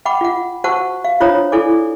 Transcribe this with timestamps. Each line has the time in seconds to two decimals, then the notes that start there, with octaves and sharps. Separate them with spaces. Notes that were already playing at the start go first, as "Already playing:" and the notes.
0.05 F#5 G5 B5 D6
0.21 F4 F#5
0.64 F#4 C5 F#5 A5 C#6 E6
1.04 F5
1.20 D4 F4 C5 C#5 A#5 D#6
1.52 E4 A4 D5 G#5 D6